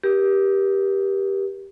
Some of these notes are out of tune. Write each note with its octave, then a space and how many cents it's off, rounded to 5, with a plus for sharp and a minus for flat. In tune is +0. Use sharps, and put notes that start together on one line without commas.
G4 +0 A#4 +40